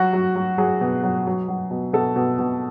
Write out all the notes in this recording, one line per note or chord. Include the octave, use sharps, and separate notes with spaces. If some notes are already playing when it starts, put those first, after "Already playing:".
Already playing: F#3 F#4
F#3
F#3
F#3 G#4
B2
F#3
F#3
F#3
B2
B2 A4
B2
B2